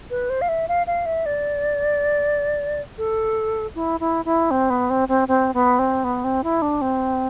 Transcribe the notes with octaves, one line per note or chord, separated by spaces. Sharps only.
B4
C5
F5
E5
F5
F5
E5
D5
A4
E4
E4
E4
C4
B3
C4
C4
C4
B3
C4
B3
C4
E4
D4
C4